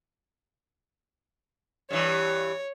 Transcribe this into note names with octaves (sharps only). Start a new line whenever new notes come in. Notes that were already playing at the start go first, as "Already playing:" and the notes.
G2 E3 C#5